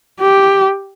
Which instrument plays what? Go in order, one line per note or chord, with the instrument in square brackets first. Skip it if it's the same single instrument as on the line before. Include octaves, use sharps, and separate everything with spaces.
[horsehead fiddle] G4